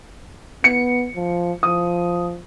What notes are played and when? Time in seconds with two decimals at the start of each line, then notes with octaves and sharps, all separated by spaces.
0.64 B3 C#7
1.16 F3
1.63 F3 D#6